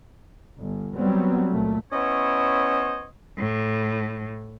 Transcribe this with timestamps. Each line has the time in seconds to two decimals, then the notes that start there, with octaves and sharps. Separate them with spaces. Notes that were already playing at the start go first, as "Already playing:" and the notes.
0.57 G1
0.96 F#3 G3 B3 C4
1.48 C#2 A#2 A3
1.92 B3 C#4 E4 C5 C#5 D#5
3.38 A2